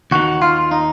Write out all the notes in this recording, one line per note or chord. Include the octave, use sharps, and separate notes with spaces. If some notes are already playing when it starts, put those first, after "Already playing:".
D#2 D#3 F#4
F4
D#4